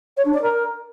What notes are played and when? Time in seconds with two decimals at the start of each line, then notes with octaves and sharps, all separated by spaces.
0.17 C#5
0.25 D4
0.33 D5
0.42 A#4